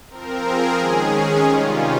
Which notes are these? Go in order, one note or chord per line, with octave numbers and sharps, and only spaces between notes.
F3 C4 A#4
G#4
D#3 G#3 C#4
C3 D#3 G3 C#4 F4